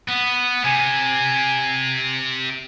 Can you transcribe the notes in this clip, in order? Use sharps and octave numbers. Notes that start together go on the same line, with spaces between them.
B3
C3 G#5